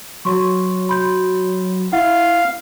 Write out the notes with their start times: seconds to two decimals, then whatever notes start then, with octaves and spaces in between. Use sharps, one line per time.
0.25 F#3 C#5 C6 C#6
0.89 B5 C6 G6
1.92 E4 F5 F#5